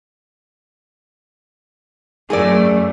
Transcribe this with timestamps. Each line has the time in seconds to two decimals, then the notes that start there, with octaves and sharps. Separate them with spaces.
2.30 F#2 A3 G#4 A#4 D5